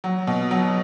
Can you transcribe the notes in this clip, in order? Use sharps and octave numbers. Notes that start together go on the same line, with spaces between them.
F#3
B2
F#3